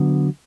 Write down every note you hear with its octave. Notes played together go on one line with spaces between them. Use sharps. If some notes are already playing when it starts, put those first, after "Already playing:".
Already playing: D3 F#3 B3